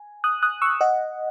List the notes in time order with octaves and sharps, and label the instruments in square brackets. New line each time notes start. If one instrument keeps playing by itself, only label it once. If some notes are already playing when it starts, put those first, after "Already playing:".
Already playing: [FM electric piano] G#5
D#6 F#6
D#6 F#6
C#6 E6
D#5 F#5